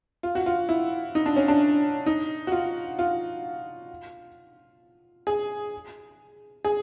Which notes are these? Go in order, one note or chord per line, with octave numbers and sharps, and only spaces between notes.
F4
F#4
F4
E4
D#4
D4
C#4
D4
D#4
F#4
F4
F4
G#4
G#4